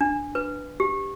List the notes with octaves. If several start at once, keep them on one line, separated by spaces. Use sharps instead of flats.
D4
B4
G4